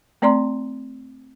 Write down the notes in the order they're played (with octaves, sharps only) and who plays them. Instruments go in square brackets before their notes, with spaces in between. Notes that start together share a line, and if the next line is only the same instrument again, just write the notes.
[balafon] A3 C4 D5 A#5 C6